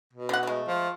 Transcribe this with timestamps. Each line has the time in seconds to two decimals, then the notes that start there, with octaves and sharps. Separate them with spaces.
0.13 B2
0.29 D3 F#5
0.43 G#3 A3
0.67 F3